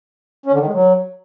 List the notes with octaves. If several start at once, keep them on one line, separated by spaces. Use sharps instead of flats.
C#4
D3
D#3
G#3
F#3